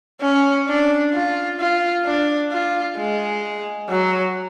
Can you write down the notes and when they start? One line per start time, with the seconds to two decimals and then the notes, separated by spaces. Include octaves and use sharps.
0.21 C#4
0.68 D4
1.13 F4
1.59 F4
2.05 D4
2.51 F4
2.97 G#3
3.89 F#3